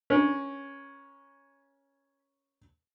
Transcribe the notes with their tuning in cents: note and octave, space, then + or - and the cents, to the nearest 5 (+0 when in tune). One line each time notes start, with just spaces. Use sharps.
C#4 +0 A#4 +40